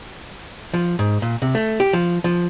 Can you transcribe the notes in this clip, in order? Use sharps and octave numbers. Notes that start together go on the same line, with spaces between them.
F3
G#2
A#2
C3
A3
G4
F3
F3